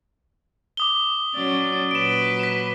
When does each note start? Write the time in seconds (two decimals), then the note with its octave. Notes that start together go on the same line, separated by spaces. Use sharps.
0.77 D6 D#6 G7
1.35 F#3 C#4 D5
1.91 A#2 F#3 B4 D7 E7
2.39 B6 E7